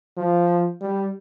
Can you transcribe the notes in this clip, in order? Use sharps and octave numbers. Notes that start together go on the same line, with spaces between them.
F3
G3